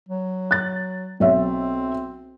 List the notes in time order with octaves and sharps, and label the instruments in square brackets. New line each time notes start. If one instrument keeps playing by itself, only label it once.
[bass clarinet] F#3
[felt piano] F#6 A6
[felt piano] B1 C#5 E5 [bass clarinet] C4